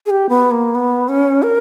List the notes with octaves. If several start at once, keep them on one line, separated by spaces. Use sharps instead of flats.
G#4
G4
B3
A#3
B3
C#4
A#4